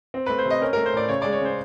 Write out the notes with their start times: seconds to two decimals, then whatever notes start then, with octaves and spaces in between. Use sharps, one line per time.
0.14 C4
0.26 A3 B4
0.38 C5
0.45 C3
0.50 D#5
0.61 C#4 A#4
0.73 A3 A#4
0.86 C5
0.93 A2 D5
1.09 C#3 C#5
1.22 G#3 D5
1.32 C#5
1.41 C#3 C5